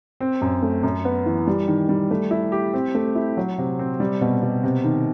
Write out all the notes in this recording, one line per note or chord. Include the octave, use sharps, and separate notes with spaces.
C4
F#2
A3
F#2
B3
E3
G3
D#3
G3
A3
E4
G4
C4
A3
E4
F#3
C3
C4
G3
B2
B2
C3
D#3